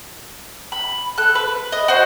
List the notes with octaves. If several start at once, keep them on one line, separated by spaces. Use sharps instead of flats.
B5
A4 F#6
B4
D#5
F#4 C5